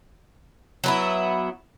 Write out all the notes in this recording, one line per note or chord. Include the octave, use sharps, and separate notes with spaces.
F#3 B3 E4